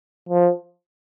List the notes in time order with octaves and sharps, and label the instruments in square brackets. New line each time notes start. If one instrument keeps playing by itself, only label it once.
[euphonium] F3